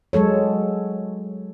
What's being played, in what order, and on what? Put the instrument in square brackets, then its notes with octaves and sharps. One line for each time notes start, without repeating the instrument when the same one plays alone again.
[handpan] F#3 G#3 A4 C#5